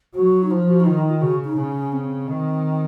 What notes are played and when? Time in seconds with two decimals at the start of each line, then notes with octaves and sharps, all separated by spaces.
0.15 F#3 F#4
0.43 D#4
0.50 F3 F4
0.68 F#4
0.80 D#4
0.86 D#3 F4
0.98 D#4
1.10 F4
1.21 C#3 F#4
1.45 D#4
1.56 C#3 C#4
1.92 C4
2.28 D#3